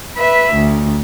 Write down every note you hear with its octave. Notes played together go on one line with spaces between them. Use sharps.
B4 E5
D2